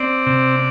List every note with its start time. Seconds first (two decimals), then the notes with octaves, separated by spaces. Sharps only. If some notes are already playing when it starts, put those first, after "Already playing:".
Already playing: C4 D5
0.26 C3